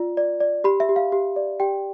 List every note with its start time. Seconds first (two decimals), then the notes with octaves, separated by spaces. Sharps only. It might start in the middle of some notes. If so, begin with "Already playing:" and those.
Already playing: F4 D5
0.17 D5
0.40 D5
0.64 G4 B5
0.80 E5
0.89 G4
0.96 F5
1.12 G4
1.36 D5
1.60 G4 G5